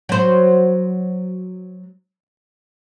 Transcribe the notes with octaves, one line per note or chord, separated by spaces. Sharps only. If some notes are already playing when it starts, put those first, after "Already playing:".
F#3 C5